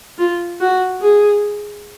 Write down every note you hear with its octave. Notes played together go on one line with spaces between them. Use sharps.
F4
F#4
G#4